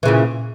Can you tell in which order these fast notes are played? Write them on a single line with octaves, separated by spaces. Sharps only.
E3 C#3 A#2